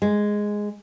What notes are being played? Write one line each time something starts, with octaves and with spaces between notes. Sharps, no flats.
G#3